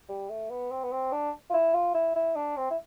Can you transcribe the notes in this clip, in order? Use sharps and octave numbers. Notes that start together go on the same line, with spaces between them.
G3
A3
B3
C4
B3
C4
D4
F4
E4
F4
E4
E4
D4
C4
E4